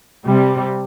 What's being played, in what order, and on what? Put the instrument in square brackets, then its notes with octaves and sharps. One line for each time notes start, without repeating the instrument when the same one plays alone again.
[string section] C3 G3